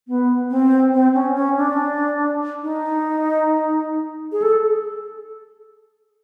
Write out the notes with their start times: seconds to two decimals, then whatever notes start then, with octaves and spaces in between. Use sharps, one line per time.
0.08 B3
0.51 C4
0.93 C4
1.14 C#4
1.35 C#4
1.57 D4
2.63 D#4
4.32 G#4
4.42 A4